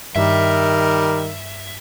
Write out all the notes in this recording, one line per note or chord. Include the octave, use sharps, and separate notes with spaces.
G2 D#3 G3 A#4 E5